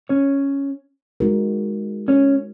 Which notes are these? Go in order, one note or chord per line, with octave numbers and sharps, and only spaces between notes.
C#4 C#5
G#3 D#4 F#4 A#4
C#4 C#5